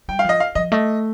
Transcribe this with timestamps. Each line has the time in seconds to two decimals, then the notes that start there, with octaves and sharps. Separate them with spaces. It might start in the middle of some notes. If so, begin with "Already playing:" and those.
0.08 G3 G5
0.19 F5
0.25 F3 D#5
0.40 F5
0.55 F3 D#5
0.72 A3 D#5